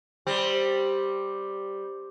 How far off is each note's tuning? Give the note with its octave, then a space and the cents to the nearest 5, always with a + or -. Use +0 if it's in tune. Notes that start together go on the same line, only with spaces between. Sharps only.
G3 +0 C4 +5